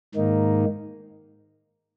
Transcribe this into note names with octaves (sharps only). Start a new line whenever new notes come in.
G#2 D#3 A#3 D#4